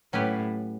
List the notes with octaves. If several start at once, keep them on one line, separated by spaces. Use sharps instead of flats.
A2 F#3 C#4 G4 B4